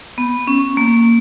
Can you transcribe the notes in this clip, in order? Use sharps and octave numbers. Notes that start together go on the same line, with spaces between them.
B3
C#4
A#3